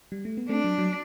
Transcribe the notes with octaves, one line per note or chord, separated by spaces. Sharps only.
G3
A3
B3
A3 C4 D4
F#3
F#3